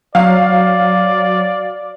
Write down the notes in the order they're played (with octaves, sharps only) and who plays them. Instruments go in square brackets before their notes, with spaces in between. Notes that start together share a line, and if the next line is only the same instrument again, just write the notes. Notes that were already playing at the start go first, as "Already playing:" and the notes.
[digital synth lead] F#3 [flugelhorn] D5 [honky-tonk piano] F5